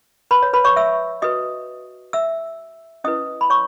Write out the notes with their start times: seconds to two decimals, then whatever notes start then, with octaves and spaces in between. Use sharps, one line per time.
0.31 B4 B5
0.43 C#5
0.53 B4 B5
0.65 C#5 C#6
0.76 E5 E6
1.22 F#4 B4 D#5 D#6
2.13 E5 E6
3.04 C#4 E4 B4 D#5 D#6
3.41 B5
3.50 C#5 C#6